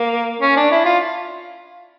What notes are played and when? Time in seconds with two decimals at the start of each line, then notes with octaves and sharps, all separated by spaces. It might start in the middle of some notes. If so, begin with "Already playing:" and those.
Already playing: A#3
0.41 C#4
0.56 D4
0.71 E4
0.85 F4